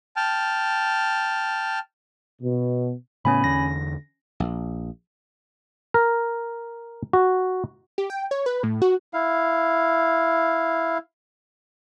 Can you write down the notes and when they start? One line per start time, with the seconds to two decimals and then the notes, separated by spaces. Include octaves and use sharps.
0.16 G5 A5 F6
2.42 B2
3.25 A2 C#3 B3 C#4 G#5 B5
3.44 E2 D3 A#6
4.40 A#1
5.94 A#4
7.13 F#4
7.98 G4
8.10 G5
8.31 C#5
8.46 B4
8.63 A2
8.82 F#4
9.14 E4 F5